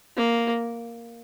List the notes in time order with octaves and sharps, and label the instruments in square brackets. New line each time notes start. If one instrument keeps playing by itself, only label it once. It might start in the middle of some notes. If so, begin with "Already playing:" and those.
[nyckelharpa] A#3